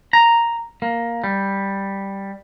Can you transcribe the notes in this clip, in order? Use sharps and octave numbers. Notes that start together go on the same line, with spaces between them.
A#5
A#3
G3